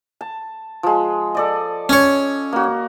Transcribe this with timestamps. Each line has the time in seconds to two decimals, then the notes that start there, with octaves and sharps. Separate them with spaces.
0.21 A5
0.83 F3 G#3
1.35 A4 D5 D#5
1.89 C#4 C#5
2.53 A#3 F#4